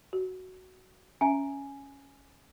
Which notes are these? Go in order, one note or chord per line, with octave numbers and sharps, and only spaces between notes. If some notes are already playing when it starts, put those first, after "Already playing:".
F#4
C#4 E5 G#5 A#5